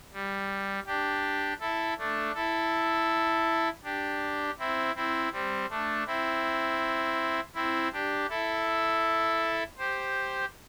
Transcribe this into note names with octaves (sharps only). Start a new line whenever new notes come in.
G3
D4 G4
E4 A4
A3 D4
E4 A4
D4 G4
C4 E4
C4 E4
G3 C4
A3 D4
C4 E4
C4 E4
D4 G4
E4 A4
G4 C5